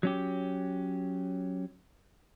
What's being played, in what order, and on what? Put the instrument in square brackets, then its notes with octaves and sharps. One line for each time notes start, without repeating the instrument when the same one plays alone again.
[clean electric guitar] F#3 C#4 G4